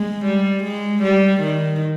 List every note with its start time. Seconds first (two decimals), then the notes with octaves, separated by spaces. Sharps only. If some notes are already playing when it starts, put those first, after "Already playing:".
Already playing: G#3
0.25 G3
0.63 G#3
1.02 G3
1.41 D#3